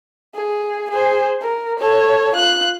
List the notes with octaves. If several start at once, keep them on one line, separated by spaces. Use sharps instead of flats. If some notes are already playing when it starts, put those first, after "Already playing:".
G#4
G#4 C5
A#4
A4 C#5
F4 F#6